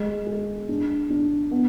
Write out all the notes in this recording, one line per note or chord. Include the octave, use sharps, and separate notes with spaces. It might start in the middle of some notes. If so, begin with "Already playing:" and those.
Already playing: G#3
G#4
D4
D4
B3